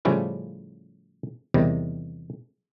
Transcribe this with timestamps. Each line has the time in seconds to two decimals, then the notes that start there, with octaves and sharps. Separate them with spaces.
0.05 A2 C#3 F3 G3 C#4 E4
1.54 E2 C3 D#3 G3